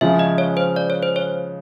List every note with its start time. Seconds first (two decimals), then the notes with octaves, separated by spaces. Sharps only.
0.01 C#3 F3 G#3 E5
0.19 D#5
0.38 C#5
0.57 C5
0.76 D5
0.90 C#5
1.03 C5
1.16 C#5